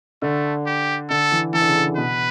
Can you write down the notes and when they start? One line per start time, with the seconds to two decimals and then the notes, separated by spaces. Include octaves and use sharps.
0.22 D3 A3
0.66 G4
1.10 D3 A4
1.32 E3
1.53 E3 A4
1.61 D3
1.68 C#3
1.76 D3
1.97 B2 B4